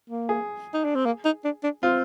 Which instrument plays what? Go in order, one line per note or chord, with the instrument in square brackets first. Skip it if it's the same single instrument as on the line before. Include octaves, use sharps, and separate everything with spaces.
[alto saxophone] A#3
[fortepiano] G#4
[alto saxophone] D#4
D4
C4
A#3
D#4
D4
D4
[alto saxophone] C4 [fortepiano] F4